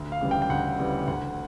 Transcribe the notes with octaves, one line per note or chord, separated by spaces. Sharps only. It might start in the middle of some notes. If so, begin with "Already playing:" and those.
Already playing: D2
F5
C#3 E3 G3
G5
G5
D2 F#5
C#3 E3 G3
D2 F#5